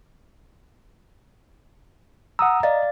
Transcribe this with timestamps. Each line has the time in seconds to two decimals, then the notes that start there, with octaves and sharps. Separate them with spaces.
2.39 F#5 A#5 D#6 E6
2.63 D5 D#5 F5 A6